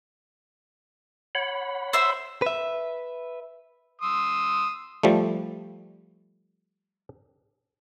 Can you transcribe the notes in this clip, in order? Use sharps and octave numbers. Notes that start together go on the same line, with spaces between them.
C#5 F#5 B5
C5 E5 E6
B4 E5
C6 D#6 E6
F3 G3 A3